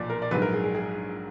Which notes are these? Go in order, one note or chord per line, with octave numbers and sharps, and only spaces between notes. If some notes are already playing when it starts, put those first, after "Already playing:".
Already playing: B1 A#2 F3 D5
A#4
D5
A#1 G#2 F#3 B4
A#4
G#4
G#4
G#4